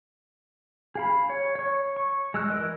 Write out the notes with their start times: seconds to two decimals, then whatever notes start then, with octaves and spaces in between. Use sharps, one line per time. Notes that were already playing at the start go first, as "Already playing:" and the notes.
0.95 G#4 F5 B5
1.29 C#5
1.55 C#5 C#6
1.96 C#6
2.34 G#3 E6 F#6
2.50 E3 A#4 D#5